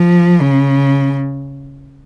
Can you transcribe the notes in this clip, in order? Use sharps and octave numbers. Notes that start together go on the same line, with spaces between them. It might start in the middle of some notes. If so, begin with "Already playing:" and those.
Already playing: F3
C#3